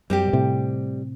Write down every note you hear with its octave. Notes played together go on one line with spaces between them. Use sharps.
F#2 G3 C4 G4
B2
A2 C3